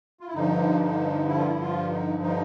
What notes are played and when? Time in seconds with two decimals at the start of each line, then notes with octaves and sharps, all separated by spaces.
0.20 F4
0.27 E4
0.34 G2 D3 F3 D#4
0.82 D#4
1.28 E4
1.38 F4
1.46 E4
1.60 F4
1.90 D#4
2.22 D#4